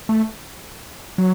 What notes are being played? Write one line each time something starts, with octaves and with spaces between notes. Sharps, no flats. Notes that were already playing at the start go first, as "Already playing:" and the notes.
A3
F#3